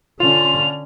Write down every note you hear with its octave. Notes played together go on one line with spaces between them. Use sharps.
D3 C#4 F4 F7